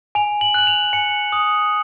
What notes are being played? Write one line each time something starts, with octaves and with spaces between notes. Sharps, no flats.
G#5 F7
F#7
F#6 F#7
F7
G#5 C#7
D#6